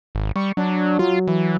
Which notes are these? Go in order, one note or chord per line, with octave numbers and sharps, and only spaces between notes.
G#1
G3 C#6
F#3 D4
F#3 F4
E3